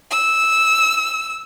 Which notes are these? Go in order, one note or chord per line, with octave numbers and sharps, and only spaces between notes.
E6